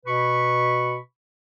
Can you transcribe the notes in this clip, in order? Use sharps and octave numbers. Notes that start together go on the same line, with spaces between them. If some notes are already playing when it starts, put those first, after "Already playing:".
B2 B4 B5 C#6